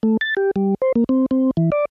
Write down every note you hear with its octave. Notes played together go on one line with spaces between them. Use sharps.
A3
A6
G4
G3
C5
A#3
C4
C4
E3
D5